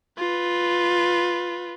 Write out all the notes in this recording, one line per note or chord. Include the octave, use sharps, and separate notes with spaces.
F4 B4